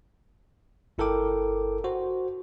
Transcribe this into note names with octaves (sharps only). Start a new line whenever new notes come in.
G1 E4 A4 A#4 G5 D6
F#4 C5